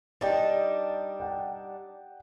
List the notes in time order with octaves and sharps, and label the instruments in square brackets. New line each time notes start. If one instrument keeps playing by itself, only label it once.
[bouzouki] G3 D4 D#4 [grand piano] D5 D#5 G5
[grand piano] F#5 G5